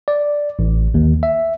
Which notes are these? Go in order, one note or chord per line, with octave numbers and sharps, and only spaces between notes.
D5
A1
D#2
E5